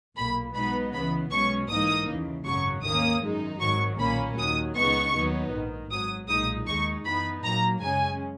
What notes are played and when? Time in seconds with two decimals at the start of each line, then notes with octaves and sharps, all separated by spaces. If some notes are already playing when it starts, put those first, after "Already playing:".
0.16 B1 A#2 A#3 B5
0.55 B1 B2 G#3 B3 D#4 B5
0.93 C#2 C#3 E3 B3 B5
1.31 B1 B2 G#3 C#4 C#6
1.70 G#2 E3 A#3 D#4 D#6
2.08 D#2 C#3 E3
2.46 G#1 F#2 C#3 F#3 C#6
2.84 D#2 D#3 A#3 C#4 D#6
3.23 F#2 D#3 G#3 D#4
3.61 G#1 G#2 D#3 F#3 C#6
3.99 B1 A#2 A#3 C#4 B5
4.37 D#2 D#3 F#3 D#6
4.76 C#2 C#3 G#3 B3 D#4 C#6
5.14 D#2 D#3 F#3 B3 D#4
5.52 A#1 G#2 D#3
5.91 G#1 G#2 F#3 D#6
6.29 B1 A#2 G#3 D#4 D#6
6.67 D#2 D#3 G#3 D#4 C#6
7.05 F#2 E3 B3 D#4 B5
7.44 A#2 F#3 A#3 A#5
7.82 F#2 C#3 G#3 C#4 G#5